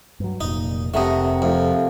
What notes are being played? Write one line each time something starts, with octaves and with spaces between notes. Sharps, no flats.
G2 F#3
F1 A#2 D#4
F1 C3 A3 A#4 D#5 F#5
F2 A3 F4